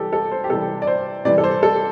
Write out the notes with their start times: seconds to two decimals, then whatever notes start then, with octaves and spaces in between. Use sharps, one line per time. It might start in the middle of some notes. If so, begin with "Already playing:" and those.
Already playing: C3 E3 G3 G4 A4
0.13 A4
0.32 C5
0.44 G4
0.50 C3 E3 G3 A4
0.82 D5
0.87 C5
1.25 C3 E3 G3 D5
1.38 A4
1.44 C5
1.63 A4